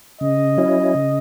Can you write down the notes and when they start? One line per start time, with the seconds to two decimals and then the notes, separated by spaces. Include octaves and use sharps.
0.21 C#3 D#5
0.58 F#3 C#4 E4
0.95 C#3